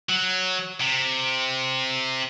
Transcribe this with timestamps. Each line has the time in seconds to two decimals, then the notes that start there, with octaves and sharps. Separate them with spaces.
0.09 F#3
0.80 C3